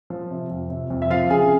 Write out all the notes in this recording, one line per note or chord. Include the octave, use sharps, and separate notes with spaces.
F3
C3
F2
C3
F2
E5
F3 F4 F5
C#3 G#4 G#5